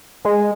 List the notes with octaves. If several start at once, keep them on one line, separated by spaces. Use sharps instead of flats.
G#3